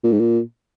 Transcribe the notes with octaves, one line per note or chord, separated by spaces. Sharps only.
A#2
G#2
A#2